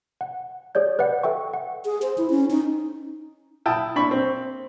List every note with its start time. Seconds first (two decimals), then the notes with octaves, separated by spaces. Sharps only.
0.21 F#5
0.75 G#4 C#5 D5 G6
0.99 B4 D5 D#5 F#5
1.23 A4 E5 G5 C#6
1.54 F#5
1.85 G#4
2.02 C5
2.18 E4
2.30 C#4
2.50 D#4
3.66 E4 G5 A5 D#6
3.96 D4 B5 C#6
4.11 C4